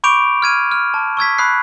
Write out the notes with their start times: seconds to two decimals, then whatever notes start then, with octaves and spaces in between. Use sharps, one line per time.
0.04 B5 C#6 D6 G6 D7 F7
0.42 F6 G#6 D#7
0.71 F6
0.94 A5
1.17 C#6 E6 G#6 B6
1.38 B5 D#6 F#6 C7